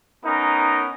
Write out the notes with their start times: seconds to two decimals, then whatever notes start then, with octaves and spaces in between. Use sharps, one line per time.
0.24 B3 C#4 D#4 A#4